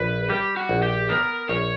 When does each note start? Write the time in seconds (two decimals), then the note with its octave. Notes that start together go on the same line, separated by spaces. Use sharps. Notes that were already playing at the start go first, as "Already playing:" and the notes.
Already playing: A#1 B4
0.30 G3 G4
0.57 F#4
0.69 A#1
0.83 G4
1.09 B3 A#4
1.49 A#1 C#5